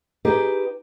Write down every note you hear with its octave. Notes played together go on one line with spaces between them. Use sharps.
D#4 G4 G#4 B4